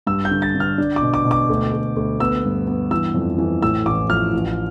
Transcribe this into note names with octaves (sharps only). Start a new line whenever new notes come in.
G2 E6
G6
D3
A6
D3
F6
D4
D6
B2
D6
B2
D6
D2
D2
D2
B3 E6
G2
B3
E3 E6
F2
E3
A2 E6
A1 D6
F3 F6
A1